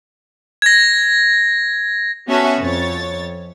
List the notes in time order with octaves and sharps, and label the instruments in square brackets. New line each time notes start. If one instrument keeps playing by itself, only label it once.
[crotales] G#6 A#6
[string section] B3 C#4 F#4 A4 E5 G#5
F2 C#5 A6